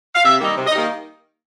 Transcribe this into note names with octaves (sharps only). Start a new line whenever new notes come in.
F5
C3 E5
D#3 G3 A#3 D#4
C3
D#5
D#3 G3 A#3 D#4